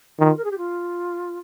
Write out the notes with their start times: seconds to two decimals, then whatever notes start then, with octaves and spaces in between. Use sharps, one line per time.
0.19 D#3 F4
0.37 A#4
0.44 G#4
0.51 G4
0.58 F4